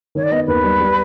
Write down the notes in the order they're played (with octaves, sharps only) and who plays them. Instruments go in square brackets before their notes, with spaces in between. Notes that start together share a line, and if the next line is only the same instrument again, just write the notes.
[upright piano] D#3 [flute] C#5
[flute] D5
[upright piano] B3 [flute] D#5
[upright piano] D#2 [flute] B4
[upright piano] G3
G3